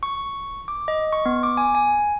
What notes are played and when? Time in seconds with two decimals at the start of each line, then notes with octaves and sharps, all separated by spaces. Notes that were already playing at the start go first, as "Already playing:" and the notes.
0.03 C#6
0.68 D6
0.88 D#5
1.13 C#6
1.26 B3
1.43 D6
1.57 G#5
1.75 G#5